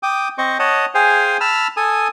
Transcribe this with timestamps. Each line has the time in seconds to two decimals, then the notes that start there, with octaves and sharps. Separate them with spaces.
0.03 G5 D6 D#6
0.38 C4 C5 D#5 C#6
0.59 C#5 D#5 F#5 A5 D#6
0.94 G#4 C5 F5 G5 G#5
1.41 A5 B5 E6 F6
1.77 A4 G#5 D#6